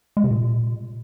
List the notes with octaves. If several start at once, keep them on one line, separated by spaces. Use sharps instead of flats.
G#3
C3
A#2